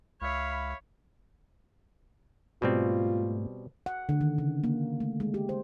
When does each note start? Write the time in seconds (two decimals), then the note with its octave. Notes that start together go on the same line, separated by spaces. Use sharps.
0.22 C#2 C#5 E5 F5 B5
2.62 G#2 B2 G3 A3 C4 F4
3.86 F#5
4.09 D3
4.21 D#3
4.38 C#3
4.64 A#3
5.00 A3
5.20 G#3
5.34 G4
5.49 C5